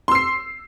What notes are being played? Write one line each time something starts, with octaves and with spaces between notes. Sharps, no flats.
C6 E6 C7